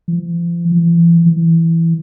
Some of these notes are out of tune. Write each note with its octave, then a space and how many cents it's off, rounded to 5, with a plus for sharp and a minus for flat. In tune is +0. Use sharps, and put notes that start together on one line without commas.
F3 -40
E3 +40
E3 +5